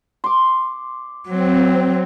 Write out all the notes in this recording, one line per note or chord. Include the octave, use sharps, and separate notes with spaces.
C6 D6
F#3 C4